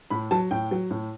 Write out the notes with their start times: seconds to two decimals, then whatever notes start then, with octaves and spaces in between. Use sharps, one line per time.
0.10 A2 B5
0.31 F#3 A5
0.51 A2 G5
0.71 F#3
0.91 A2